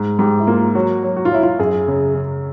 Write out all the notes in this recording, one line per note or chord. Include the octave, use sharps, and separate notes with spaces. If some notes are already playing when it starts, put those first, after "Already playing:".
Already playing: G#2
G#2 G4
E4
A#3 F4
F#3 F#4
F#3
F#4
F4
F#3 E4
F4
F#2 G#4
C#3
C#3